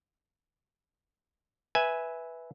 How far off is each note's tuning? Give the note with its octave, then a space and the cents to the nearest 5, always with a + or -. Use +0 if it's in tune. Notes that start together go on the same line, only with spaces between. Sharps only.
B4 +0 E5 -10 G#5 +0